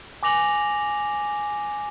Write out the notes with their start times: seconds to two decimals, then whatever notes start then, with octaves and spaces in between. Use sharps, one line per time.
0.23 G#5 D6 A#6 F7 F#7